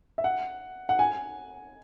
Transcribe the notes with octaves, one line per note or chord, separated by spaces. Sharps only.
E5
F#5
F#5
G#5